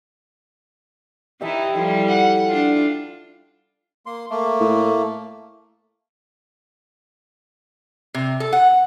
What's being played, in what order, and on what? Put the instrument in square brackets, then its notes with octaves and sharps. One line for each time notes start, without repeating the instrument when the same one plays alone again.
[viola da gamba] E3 D#4 E4 [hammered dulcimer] G4 E5 A5
[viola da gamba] F3 G3 [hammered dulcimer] E4 A4 C6
[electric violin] F#5
[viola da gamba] D4 F4
[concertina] A#3 C6
A3 A#3
[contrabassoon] A2
[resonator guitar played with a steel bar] C3
A4
F#5